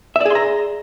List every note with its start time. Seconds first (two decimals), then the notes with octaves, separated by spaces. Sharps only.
0.16 E5
0.21 D5
0.26 G#4
0.30 C6
0.35 A#5